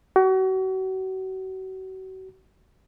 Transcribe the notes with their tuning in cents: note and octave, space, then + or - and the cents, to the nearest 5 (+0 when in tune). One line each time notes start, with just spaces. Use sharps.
F#4 +35